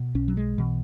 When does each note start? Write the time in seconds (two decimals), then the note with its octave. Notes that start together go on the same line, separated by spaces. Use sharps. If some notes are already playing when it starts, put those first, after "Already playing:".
Already playing: B2
0.15 B1 C#4
0.28 F#3
0.37 G#3
0.58 B2 E3